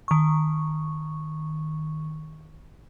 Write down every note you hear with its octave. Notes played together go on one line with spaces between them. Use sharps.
D#3 C#6